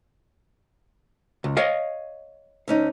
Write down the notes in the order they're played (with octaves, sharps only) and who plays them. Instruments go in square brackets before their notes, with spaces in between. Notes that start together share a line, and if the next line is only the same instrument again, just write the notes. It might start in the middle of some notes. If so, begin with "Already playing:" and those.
[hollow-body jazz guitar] C#2
C#5 D#5 F5
[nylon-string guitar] D2 C#4 D#4